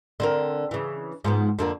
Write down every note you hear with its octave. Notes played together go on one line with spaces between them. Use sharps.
D3 C4 A#4
C#3 E3
G#2 F3 B3
F2 D3 A#3